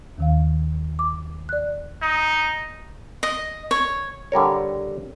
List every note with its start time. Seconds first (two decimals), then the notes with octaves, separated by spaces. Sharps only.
0.18 D#2 D#3 F5
0.99 D6
1.49 D5 F#6
2.02 D#4
3.23 D#5
3.71 C#5
4.32 D3 G3 A#4 C#5